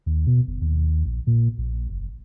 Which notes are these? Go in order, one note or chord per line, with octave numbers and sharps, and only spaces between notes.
D#2
B2
F#1
D#2
A#1
A#2
A#1
F#1